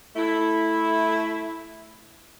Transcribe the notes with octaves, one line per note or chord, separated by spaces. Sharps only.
A3 E4